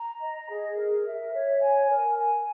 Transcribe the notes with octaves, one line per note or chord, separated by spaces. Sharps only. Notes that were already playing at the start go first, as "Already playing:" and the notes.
Already playing: A#5
D#5
G#4
A#4
E5
C#5
G#5
A#4
G#5